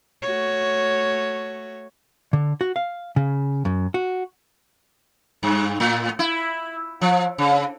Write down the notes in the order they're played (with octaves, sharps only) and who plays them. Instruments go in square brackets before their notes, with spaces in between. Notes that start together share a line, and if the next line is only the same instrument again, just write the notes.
[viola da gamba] A3 F#4 C#5
[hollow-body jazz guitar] D3
F#4
F5
C#3
F#2
F#4
[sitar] G2
A2
E4
F3
C#3